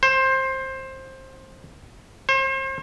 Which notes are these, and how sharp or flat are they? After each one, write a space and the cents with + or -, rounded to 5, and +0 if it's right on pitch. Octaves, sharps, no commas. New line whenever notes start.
C5 +20
C5 +40